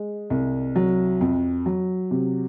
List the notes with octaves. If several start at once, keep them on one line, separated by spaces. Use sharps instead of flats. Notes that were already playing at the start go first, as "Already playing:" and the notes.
Already playing: G#3
C2
F#3
F2
F#3
C3